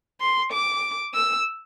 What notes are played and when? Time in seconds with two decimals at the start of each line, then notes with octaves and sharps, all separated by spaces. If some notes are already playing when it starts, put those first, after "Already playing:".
0.21 C6
0.52 D6
1.14 E6